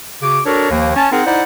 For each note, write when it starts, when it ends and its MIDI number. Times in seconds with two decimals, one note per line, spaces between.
0.22 0.40 49
0.22 0.40 66
0.22 0.40 86
0.45 0.69 62
0.45 0.69 66
0.45 0.69 69
0.45 0.69 70
0.45 0.69 73
0.71 0.92 39
0.71 0.92 51
0.71 0.92 53
0.71 0.92 58
0.96 1.11 61
0.96 1.11 81
1.12 1.22 60
1.12 1.22 63
1.12 1.22 68
1.12 1.22 70
1.12 1.22 78
1.26 1.43 63
1.26 1.43 64
1.26 1.43 72
1.26 1.43 74
1.26 1.43 78